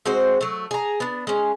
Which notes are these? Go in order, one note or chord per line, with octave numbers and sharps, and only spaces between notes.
G#3 C4 F#4 C5
F#3 A3
G#4 A#5
B3 D4
G#3 C#4